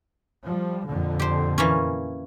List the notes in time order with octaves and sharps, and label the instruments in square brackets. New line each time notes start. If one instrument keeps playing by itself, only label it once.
[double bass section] F3 G3
F2 A#2 D3
[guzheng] G4 C5
E3 A#3 C#4